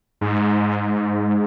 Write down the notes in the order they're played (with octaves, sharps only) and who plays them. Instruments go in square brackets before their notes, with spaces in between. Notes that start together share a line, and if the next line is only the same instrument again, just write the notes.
[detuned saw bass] G#2